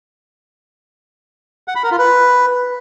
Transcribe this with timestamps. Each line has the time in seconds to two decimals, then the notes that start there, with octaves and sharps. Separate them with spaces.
1.68 F#5
1.76 B5
1.83 A#4
1.91 F4
1.99 B4